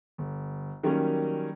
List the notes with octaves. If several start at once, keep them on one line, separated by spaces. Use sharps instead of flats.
G1
D#3 F#3 G3 A#3 C#4